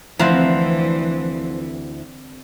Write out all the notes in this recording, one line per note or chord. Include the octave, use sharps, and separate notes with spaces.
D2 D3 E3 F3 C4 E4 F#5 A#5